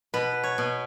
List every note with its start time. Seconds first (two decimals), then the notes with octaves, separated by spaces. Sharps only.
0.14 B2 B4
0.43 C#5
0.58 B2